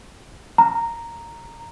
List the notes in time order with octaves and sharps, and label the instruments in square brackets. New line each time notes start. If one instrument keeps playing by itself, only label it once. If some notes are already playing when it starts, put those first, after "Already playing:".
[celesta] A#5